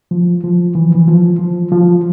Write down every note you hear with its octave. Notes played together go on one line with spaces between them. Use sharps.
F3
F3
E3
E3
F3
F3
F3